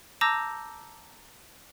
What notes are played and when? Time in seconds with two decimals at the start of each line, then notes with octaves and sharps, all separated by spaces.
0.21 A5 A#5 D6 E6 G6 A#6